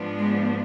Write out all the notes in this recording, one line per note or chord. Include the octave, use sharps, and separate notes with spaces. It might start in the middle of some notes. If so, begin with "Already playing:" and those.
Already playing: G#2 F3 B3 D4
G#3